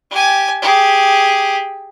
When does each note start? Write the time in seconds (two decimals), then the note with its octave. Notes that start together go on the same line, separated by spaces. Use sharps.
0.11 G4 G#5
0.62 G4 G#4